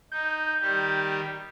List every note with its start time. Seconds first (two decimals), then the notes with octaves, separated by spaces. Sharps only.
0.12 D#4 G6
0.61 D#3 G3 G4